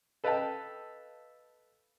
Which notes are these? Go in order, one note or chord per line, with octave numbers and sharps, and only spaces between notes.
A4 B4 D#5 F5 G5 A5